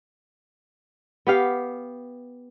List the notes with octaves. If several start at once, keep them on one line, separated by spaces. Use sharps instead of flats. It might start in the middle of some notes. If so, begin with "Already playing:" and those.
B3 G4 F5